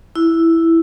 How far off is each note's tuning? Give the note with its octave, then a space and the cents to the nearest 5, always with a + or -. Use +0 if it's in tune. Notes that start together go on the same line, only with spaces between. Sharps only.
E4 +0